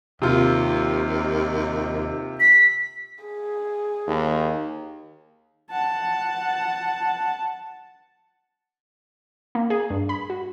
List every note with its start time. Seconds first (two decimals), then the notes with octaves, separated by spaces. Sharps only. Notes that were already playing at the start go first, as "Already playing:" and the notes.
0.22 D#2 C3 F4
2.40 B6
3.24 G#4
4.07 D#2
5.70 F#5 A5
9.55 A#3
9.70 G#4
9.90 G2
10.09 B5
10.30 F#4